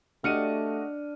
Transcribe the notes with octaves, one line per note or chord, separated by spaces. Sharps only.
A3 D4 F#4 G4 D#5 F6 C#7 D#7